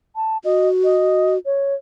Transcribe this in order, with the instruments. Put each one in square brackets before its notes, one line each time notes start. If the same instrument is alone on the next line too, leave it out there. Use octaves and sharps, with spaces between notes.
[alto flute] A5
[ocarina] F#4 [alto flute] D#5
[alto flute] D#5
C#5